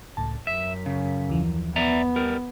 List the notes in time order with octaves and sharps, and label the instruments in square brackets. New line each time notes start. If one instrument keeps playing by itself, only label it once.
[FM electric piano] C#2 A2 A5
[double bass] F#2 [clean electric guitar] E5 [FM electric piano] B6
[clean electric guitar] C#3
[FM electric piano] D#2 E3 F3
[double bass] B3 [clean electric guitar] D5 E5 A#5
[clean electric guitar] G3 A#4